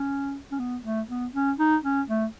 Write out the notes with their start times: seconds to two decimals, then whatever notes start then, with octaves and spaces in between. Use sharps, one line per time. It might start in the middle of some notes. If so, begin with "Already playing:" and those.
Already playing: C#4
0.52 C#4
0.59 B3
0.84 A3
1.09 B3
1.34 C#4
1.59 D#4
1.84 C#4
2.08 A3